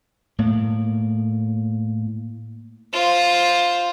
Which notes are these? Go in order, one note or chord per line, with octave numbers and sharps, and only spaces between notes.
A2 A#3
F4 C5